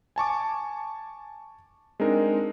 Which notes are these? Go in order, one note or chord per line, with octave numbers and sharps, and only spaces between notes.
G#5 A5 C#6 D6
G#3 C4 D4 D#4 A#4